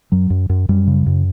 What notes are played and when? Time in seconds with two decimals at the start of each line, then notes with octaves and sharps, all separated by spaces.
0.12 F#2 F#3
0.30 F#2
0.49 F#2
0.69 F#2 G3
0.87 C#3
1.06 F#2